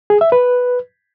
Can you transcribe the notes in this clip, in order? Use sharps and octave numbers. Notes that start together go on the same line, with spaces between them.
G#4
E5
B4